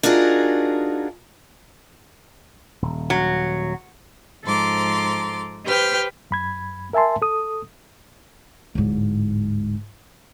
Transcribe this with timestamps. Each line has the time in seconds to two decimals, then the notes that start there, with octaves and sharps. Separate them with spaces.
0.03 D4 D#4 F4 F#4 G#4 A#4
2.82 D#1
3.10 F#3
4.44 G#2 F3 A4 A#5 C6 D6
5.65 G4 B4 C5 G5 F6 G6
6.31 F#2 B5 G#6
6.93 A#4 E5 G#5 A5 C6
7.22 A4 D#6
8.75 D1 G#2